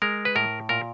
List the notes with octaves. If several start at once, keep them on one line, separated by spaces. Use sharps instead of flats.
G#3 A#4
B4
A2 A#4
A#2 A#4